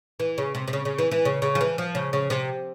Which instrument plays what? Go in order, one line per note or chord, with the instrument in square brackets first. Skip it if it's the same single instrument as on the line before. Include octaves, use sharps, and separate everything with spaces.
[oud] E3
C#3
C3
C3
C#3
C#3
E3
E3
C#3
C#3
F3
E3
F3
C#3
C#3
C3